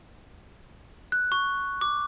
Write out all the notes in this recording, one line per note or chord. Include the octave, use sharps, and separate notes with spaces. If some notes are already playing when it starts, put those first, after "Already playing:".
F#6
C#6
D6